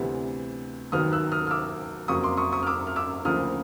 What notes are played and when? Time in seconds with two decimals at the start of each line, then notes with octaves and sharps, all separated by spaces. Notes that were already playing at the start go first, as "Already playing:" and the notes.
Already playing: D2 C3 E3 G3 B3
0.92 D#2 D#3 F#3 B3 D#6 F6
1.12 E6 F#6
1.32 D#6 F6
1.47 F6
1.51 D6 E6
2.08 F2 C#3 F#3 A#3 C#6 D#6
2.23 C6 D6
2.37 C#6 D#6
2.52 C#6 D#6
2.62 F6
2.67 D6 E6
2.87 F6
2.96 D6 E6
3.25 D2 C#3 F3 A#3 D#6 F6